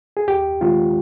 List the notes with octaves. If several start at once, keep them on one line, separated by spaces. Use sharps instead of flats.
G#4
D#2 G4
D#3 G#3 C4 F4